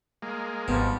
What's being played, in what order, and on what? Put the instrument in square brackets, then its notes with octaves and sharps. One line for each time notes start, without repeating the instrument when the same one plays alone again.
[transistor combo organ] G#3 A#3
[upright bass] G#1 [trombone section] G#2 F3 G3 [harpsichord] B2